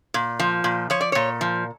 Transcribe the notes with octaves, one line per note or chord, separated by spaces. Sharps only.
A#2
F3
A#2
F3 C#5
D5
A#2 C#5
F3